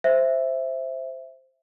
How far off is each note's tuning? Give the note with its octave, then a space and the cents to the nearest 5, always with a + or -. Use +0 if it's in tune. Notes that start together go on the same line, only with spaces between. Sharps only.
C5 +0 E5 +5